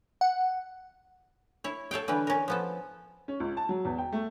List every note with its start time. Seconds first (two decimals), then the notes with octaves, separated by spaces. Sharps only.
0.21 F#5
1.64 E4 C#5
1.91 A4 C#5 F5 G5
2.08 D3 E3 G3 B4
2.27 C#4 A#4
2.48 F3 B3 A4
3.28 C#4
3.40 C#2
3.57 A5
3.69 F#3
3.85 E2
3.98 G5
4.12 A3